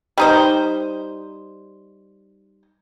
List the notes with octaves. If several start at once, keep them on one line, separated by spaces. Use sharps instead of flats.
G3 D#4 C5